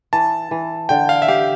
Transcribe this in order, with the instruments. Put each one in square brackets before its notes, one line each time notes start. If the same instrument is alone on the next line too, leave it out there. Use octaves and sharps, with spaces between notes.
[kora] E3 [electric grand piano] A5
[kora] E3
[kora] D3 [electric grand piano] G5
[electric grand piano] F5
E5
[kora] G4 [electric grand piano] F5